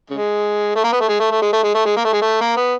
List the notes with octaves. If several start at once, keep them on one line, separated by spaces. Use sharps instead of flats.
C#3 G#3
A3
A#3
B3
A3
G#3
A3
A3
G#3
A3
G#3
A3
G#3
A#3
A3
G#3
A3
A#3
B3